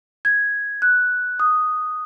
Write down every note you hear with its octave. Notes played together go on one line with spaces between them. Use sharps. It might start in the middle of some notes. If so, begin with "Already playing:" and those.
G#6
F#6
D#6